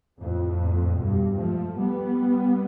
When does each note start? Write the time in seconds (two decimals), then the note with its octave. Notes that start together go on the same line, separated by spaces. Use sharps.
0.18 F2 A2
0.98 G2 B2
1.38 F3 A3
1.78 G3 B3